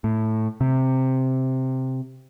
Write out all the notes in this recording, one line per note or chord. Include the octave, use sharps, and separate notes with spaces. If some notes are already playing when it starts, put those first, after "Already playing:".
A2
C3